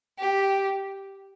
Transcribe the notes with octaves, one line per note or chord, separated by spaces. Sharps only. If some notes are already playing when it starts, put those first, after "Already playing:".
G4